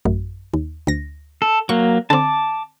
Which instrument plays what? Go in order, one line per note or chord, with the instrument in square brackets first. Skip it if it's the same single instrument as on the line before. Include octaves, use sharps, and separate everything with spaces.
[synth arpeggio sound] A1 F#2
D#2
D2 A#6
[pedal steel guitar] A4
[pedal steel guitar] F#3 A#3 [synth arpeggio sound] C#6
[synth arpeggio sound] D3 C4 [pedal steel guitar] A5 D6